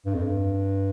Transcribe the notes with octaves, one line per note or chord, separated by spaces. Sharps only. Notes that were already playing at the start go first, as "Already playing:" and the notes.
G2
F2
G2